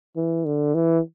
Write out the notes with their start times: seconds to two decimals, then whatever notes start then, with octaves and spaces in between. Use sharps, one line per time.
0.16 E3
0.45 D3
0.75 E3